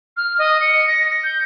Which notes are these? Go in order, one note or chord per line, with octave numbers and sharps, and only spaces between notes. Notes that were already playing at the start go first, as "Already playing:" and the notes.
F6
D#5
C#7
A#6
G6